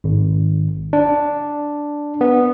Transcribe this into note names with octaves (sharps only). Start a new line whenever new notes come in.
G#1
D4
B3